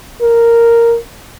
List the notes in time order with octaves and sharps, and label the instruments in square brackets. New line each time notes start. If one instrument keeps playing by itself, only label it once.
[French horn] A#4